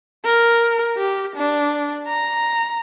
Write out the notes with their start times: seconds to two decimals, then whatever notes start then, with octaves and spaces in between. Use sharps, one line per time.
0.25 A#4
0.97 G4
1.36 D4
2.07 A#5